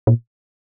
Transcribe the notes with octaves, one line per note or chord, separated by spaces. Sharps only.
A#2